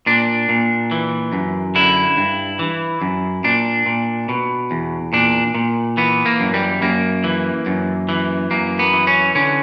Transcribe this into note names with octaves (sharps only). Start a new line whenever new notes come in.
A#2 D4
A#2
E3
F#2
D3 E4
G2
E3
F#2
A#2 D4
A#2
B2
E2
A#2 D4
A#2
E3 B3
A#3
F#2
G3
F#2 A#3
E3
F#2
E3
F#2 A#3
B3
E3
C#4
D3 C#4